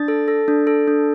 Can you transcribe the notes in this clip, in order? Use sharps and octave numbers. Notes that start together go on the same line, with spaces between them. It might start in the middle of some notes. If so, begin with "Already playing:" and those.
Already playing: D4 A6
A4
A4
D4
A4
D4